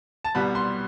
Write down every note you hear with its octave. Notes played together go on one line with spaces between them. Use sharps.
A5
C2 B2 G3 B3 B5
C6